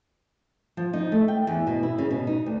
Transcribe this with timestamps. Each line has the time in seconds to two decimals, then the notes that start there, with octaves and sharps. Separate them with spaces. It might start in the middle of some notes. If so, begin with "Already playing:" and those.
0.77 F3
0.93 D#4
1.12 A3
1.28 G5
1.47 E2
1.67 B2
1.83 E4
1.98 C#3
2.11 B2
2.27 D#4
2.46 D2